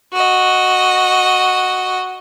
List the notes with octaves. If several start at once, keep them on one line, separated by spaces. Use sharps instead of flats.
F#4 D#5